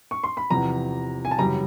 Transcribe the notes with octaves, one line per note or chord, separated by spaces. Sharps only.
C#6
C6
B5
E2 C3 F3 A#5
G#5
A5
F#2 C#3 E3 G3 A#5